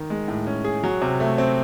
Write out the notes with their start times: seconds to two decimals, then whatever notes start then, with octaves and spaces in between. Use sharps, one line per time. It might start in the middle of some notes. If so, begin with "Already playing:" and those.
Already playing: D#3
0.10 G#3
0.28 A2
0.47 C#4
0.65 G#4
0.84 F#3
1.02 C3
1.20 A3
1.38 C4